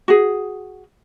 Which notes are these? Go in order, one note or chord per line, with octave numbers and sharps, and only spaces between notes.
F#4 G#4